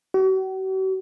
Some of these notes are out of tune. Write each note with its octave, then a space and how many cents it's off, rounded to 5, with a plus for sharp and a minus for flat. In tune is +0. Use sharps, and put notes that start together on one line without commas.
F#4 +45